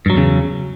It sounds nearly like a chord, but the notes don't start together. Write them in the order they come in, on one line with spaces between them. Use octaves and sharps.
G2 F#3 E2 C#3